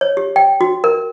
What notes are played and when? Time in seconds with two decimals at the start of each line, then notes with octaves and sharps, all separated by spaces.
0.01 C#5
0.17 G4
0.36 G5
0.61 F#4
0.84 A#4